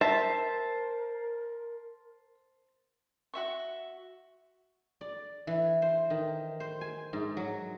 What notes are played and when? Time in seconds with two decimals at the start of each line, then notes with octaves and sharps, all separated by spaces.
0.01 A#4 C5 E5 A5
3.34 F#4 E5 C#6
5.01 D5
5.47 E3
5.82 C5
6.10 D#3
6.60 C5
6.81 G#5
7.13 G#2
7.37 F#3